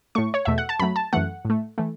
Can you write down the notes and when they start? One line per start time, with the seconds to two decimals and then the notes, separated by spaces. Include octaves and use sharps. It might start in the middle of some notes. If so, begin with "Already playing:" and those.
0.15 A2 A3 C#6
0.34 C#5
0.45 E2 B2 A3 E5
0.58 F#5
0.69 A5
0.80 F#2 F#3 A3 B5
0.96 A5
1.13 F#2 E3 A3 F#5
1.45 A2 A3
1.78 E3 A3